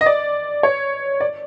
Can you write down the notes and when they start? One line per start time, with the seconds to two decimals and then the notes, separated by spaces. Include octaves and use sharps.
0.01 D#5
0.06 D5
0.63 C#5
1.20 D5